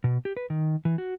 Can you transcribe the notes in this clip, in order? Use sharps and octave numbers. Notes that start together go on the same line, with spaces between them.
B2
G4
B4
D#3
E3
F#4